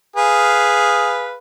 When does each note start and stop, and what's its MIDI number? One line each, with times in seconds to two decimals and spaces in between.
0.16 1.37 68
0.16 1.37 71
0.16 1.37 77